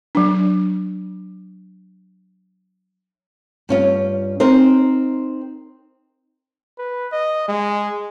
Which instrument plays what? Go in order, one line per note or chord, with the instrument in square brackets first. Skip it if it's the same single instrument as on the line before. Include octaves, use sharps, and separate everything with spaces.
[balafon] F#3 D4
[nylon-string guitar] G2 C#4 F4
C4 D#4 A#4 C5
[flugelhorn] B4
D#5
G#3